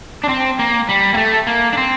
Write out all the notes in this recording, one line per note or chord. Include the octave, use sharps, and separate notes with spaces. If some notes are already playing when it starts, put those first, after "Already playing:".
D4
C4
A#3
G3
A#3
A3
A#3
D4
C4